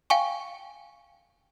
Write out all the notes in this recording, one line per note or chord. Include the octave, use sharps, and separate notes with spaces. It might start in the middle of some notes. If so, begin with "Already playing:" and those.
F5 G5 G#5 C#6